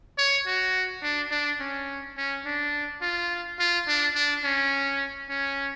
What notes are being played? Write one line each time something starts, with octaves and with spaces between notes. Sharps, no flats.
C#5
F#4
D4
D4
C#4
C#4
D4
F4
F4
D4
D4
C#4
C#4